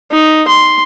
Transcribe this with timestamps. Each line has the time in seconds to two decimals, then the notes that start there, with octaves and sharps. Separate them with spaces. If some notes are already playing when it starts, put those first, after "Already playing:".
0.11 D#4
0.48 C6